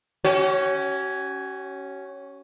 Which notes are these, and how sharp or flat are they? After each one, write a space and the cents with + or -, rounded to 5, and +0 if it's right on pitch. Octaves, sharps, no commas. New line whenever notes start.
C#4 +0 F#4 +45